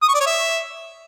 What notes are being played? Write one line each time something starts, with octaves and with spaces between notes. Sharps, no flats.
D#6
C#6
D5
C#5
E5